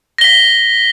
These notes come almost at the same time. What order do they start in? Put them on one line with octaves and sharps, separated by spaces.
A#6 G7 B6